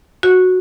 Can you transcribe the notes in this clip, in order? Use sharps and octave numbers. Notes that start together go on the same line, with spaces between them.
F#4